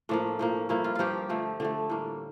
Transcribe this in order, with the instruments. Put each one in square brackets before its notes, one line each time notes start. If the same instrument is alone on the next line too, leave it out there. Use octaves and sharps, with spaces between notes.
[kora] A2 F3 A#3 D4
A2 F3 A#3
G2 F3 A#3 E4
F4
G2 F3 A#3 F4 G4
D3 F3 A3
D3 F3 A3 D4
A2 G3 A#3